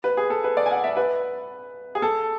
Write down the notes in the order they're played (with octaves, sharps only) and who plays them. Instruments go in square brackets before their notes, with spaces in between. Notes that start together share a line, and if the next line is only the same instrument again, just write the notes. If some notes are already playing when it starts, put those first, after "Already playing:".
[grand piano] B4
G#4
A4
B4
D5
G#5
F#5
E5
B4
G#4
A4